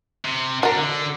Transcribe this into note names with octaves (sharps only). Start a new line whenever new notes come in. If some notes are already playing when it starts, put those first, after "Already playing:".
C3
D4 D#4 F#4 A#4
D3